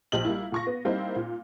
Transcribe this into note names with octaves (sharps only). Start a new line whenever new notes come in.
A#1 G4 C5 D#5 F#7
G3 A#3 E4
A#2 C#6 A#6
B3
G3 A#3 C4 D#4 E4
A#2